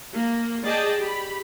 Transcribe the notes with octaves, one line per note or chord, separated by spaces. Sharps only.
A#3
G#4 D5 D#5 G5 A5
G4 B5